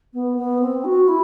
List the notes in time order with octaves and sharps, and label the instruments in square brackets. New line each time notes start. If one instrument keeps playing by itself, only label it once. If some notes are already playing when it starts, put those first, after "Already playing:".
[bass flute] B3
B3
C4
F#4
E4